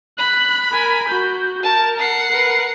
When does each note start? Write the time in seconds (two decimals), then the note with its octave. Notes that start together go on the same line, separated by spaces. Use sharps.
0.18 B5 F#6
0.72 A#4 G#5
1.08 F#4 G6
1.63 A#4 A5
1.99 F#5 C7
2.31 A#4 B4